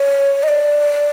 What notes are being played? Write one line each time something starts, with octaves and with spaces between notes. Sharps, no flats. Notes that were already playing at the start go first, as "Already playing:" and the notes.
Already playing: C#5
D#5
D5